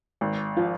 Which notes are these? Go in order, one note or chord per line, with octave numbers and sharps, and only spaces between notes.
G#1
F3 F4